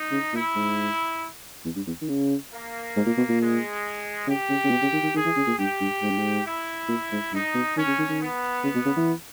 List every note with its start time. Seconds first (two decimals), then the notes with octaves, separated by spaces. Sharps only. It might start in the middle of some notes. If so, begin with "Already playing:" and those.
Already playing: D#4
0.12 C#3
0.33 A#2 E4
0.56 G#2
1.65 E2
1.76 G2
1.87 E2
2.02 D#3
2.09 C#3
2.52 A#3
2.96 G#2
3.07 A#2
3.17 B2
3.29 A#2
3.40 G#3
4.27 C#3 G4
4.50 C#3
4.64 C#3
4.71 B2
4.82 C#3
4.93 D#3
5.03 D#3
5.15 D#3 G#4
5.25 E3
5.37 C#3
5.47 A#2
5.58 G2 G4
5.81 G2
6.02 G#2
6.10 G2
6.19 G#2
6.46 E4
6.89 A#2
7.12 G#2
7.33 G2 D#4
7.54 B2
7.77 D#3 C#4
7.87 C#3
7.99 D#3
8.09 D#3
8.20 B3
8.64 C#3
8.75 B2
8.86 C#3
8.97 E3